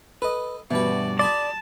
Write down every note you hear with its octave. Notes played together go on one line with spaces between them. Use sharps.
A4 B4 D#5
G2 B2 E3 F#4 B4 D5
G#4 D5 A5 B5 C6